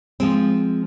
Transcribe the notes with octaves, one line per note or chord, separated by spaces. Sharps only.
F3 G#3 C4